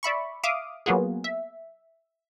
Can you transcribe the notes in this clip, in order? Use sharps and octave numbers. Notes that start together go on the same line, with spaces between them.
D5 E5 B5 C#6
E5 F5 D6 D#6
F#3 A#3 B3 F4 F#4 G#4
E5